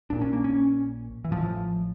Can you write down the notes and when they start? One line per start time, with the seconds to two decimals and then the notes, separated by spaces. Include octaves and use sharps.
0.10 A#1 A#2 D4
0.21 C#4
0.33 A#3
0.44 C#4
1.24 E3
1.31 A1 A2 F3